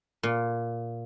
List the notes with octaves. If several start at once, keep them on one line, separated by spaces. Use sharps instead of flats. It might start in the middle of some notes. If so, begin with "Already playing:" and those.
A#2